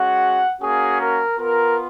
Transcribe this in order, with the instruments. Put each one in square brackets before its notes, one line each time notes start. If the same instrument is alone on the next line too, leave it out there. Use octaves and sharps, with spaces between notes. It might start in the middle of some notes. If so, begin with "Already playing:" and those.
Already playing: [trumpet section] G#3 C#4 F#4 F#5
A#3 C#4 F#4 G#4
A#4
B3 F4 A#4